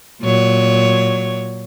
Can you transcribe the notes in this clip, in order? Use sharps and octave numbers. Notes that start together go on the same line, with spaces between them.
A#2 F#3 C#5